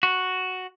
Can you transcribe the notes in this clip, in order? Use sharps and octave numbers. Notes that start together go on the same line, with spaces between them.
F#4